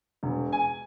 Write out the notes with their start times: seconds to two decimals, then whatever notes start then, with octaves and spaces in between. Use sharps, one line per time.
0.23 E1
0.52 G#5